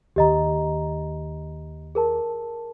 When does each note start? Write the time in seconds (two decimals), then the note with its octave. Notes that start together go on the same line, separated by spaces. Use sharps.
0.16 D#2 D#3 G4 D#5 A#5
1.95 G#4 A#4 A5